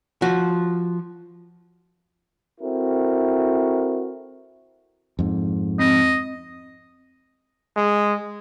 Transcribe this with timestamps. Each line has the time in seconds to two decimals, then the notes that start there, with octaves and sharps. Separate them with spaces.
0.22 F3 F#4
2.61 C4 E4 F#4 A4 A#4
5.19 F2 G#2
5.79 C4 D#5
7.76 G#3